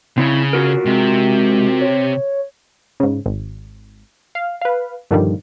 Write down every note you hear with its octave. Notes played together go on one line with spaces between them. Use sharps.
C#3 C4 E4
F4 F#4 A#4
C3 G#3
C#5
G#2 C#3
G#1
F5
B4 F5
G2 A#2 D3 D#3 F3 G3